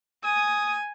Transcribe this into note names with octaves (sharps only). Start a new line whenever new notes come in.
G#5 D#6